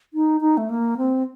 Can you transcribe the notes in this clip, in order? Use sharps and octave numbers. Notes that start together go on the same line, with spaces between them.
D#4
D#4
A3
A#3
C4